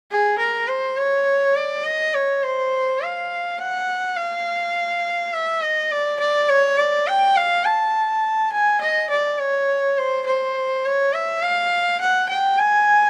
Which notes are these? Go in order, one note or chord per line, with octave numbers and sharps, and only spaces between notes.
G#4
A#4
C5
C#5
D5
D#5
C#5
C5
F5
F#5
F5
E5
D#5
D5
D5
C#5
D5
G5
F5
A5
G#5
D#5
D5
C#5
C5
C5
C#5
E5
F5
F#5
G5
G#5